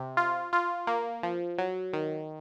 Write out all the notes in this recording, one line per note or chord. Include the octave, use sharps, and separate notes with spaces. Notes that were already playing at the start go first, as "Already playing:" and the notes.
Already playing: C3
F4
F4
A#3
F3
F#3
D#3